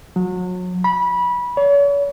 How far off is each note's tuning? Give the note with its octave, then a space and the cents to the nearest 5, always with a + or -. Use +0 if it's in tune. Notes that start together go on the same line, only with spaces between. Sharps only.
F#3 -30
B5 -20
C#5 +40